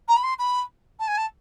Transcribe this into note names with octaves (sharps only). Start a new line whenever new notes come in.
A#5
B5
C6
B5
A5
G#5
A5